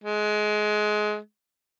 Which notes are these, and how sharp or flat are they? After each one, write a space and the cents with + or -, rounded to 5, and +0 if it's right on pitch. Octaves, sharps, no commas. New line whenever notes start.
G#3 +20